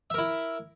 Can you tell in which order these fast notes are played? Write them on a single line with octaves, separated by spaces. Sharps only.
E5 A#4 E4